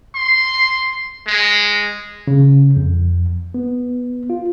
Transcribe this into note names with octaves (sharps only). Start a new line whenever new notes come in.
C6
G#3
C#3
F2
B3
F4